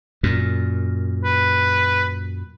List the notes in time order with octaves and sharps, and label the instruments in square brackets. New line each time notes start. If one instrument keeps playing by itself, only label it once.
[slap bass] F#2 A#2
[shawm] B4